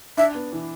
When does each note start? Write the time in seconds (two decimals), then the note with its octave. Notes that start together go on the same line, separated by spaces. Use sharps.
0.17 D4 E5
0.35 B3
0.53 E3